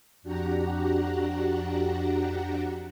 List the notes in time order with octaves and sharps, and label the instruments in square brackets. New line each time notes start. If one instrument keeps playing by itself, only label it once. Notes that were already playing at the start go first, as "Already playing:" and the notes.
[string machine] F2 D4 F#4 G4 F#5 A#5